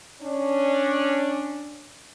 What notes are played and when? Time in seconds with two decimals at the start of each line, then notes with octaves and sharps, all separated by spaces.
0.22 C#4 D4